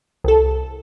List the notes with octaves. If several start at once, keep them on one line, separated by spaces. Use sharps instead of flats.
C2 A4